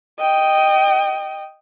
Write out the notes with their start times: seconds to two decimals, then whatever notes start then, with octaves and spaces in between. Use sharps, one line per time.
0.19 D#5 G5